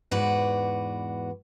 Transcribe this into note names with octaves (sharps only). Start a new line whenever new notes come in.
E2 G#2 F#4 B4 D5